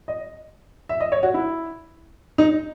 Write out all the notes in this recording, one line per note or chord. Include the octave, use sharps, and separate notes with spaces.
D#5
E5
D#5
C#5
F#4
E4
D#4